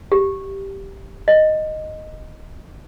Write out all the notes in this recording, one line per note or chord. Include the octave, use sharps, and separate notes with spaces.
G4
D#5